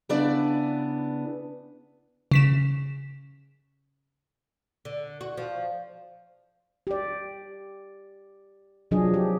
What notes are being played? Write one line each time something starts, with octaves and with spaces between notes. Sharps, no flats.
C#3 B3 D4 E4 D5
C#3 B6 E7
D3
F#4
F3
G4 D5
C3 F3 F#3 D4 G#4 D#5
G4